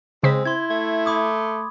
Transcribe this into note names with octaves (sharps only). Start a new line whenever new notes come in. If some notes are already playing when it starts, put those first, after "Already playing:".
C#3 G#3 C4 C5 B6
E4 C6 G#6
A3
B5 D6 D#6